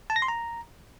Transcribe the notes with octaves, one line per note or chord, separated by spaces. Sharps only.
A5
A#6
C6
A#5